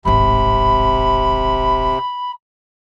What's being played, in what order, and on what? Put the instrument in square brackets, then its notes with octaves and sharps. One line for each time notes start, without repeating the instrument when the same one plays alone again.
[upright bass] D1 G#1 [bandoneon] C3 [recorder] B5